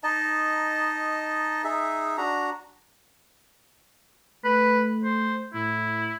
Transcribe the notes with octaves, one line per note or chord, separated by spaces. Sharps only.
D#4 D#5 A5
D#4 G#4 E5
D4 F#4 A#5
A3 B4
C5
A2 E4